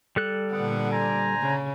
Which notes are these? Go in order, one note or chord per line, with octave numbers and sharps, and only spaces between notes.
G3 A4 F#6
A#2 D3 B3 D5 F#5
C5 G#5 A#5
C#3